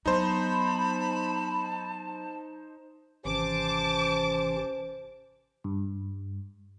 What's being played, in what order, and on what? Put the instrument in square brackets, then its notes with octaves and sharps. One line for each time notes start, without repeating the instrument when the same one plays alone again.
[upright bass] F#3 B3 [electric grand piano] D#4 C5 [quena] A5 [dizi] B5
[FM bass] G#1 [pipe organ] C3 E3 C#4 [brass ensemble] C5 [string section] A5 D6
[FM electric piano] G2